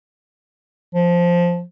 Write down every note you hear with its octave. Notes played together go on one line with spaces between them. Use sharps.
F3